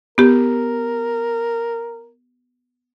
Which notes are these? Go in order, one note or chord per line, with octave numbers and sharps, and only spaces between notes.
B3 G4 A#4